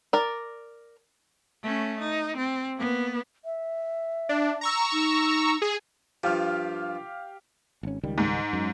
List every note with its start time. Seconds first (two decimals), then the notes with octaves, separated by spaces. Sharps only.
0.13 A#4 D5
1.63 A3 C#4
2.01 D#4
2.37 C4
2.77 A#3 B3
3.45 E5
4.29 D4
4.61 A#5 C#6 E6
4.93 D#4
5.62 G#4
6.23 G2 F3 G4 F5 F6
7.83 G#1 C#4
8.03 C#2 D#3 G3
8.18 G#2
8.53 F#2